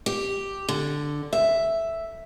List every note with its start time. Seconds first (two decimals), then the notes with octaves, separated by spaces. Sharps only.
0.06 G4
0.69 D3
1.33 E5